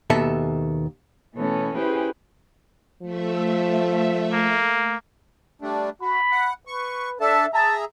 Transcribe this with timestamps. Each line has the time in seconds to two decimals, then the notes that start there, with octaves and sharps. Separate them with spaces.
0.10 D#2 B2 A4 E5
1.35 B2 E3 A3 B3 C#4 A4
1.76 C#4 E4 G4 G#4 B4 C5
3.02 F3 A3 E5
4.33 A#3
5.62 G3 A3 D4
6.02 F#4 B5
6.32 F#5
6.67 B4 C#6
7.21 D4 A4 E5 A5
7.54 G#4 E5 A5 A#5